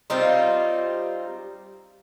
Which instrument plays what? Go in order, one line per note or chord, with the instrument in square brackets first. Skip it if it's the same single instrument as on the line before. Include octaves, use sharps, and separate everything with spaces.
[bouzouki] G3 C4 D#4 F4